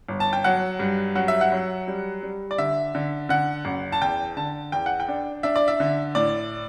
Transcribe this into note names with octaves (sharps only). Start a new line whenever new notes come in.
G1
A5
G5
F#3 F#5
G2
F#3 F#5
E5
F#5
F#3
G3
G3
D5
D3 E5
D3
D3 F#5
F#1
A5
E2 G5
D3 A5
E2 G5
F#5
G5
D4
D4 E5
D5
E5
D3
A2 D5